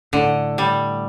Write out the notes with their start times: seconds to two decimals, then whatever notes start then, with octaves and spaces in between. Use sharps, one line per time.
0.13 A2 D3
0.58 G3